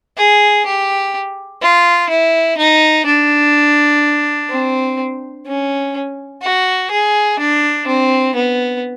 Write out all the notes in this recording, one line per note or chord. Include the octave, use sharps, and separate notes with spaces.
G#4
G4
F4
E4
D#4
D4
C4
C#4
F#4
G#4
D4
C4
B3